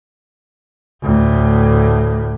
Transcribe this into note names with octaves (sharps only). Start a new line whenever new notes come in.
D2 A2